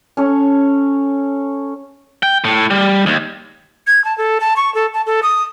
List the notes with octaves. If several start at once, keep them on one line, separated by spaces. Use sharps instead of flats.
C#4 A4 C#5
G5
A2
G3
D#2
G#6
A5
A4
A5
C#6
A4
A5
A4
D#6